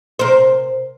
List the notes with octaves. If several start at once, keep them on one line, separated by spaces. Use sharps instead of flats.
C3 A#4 C5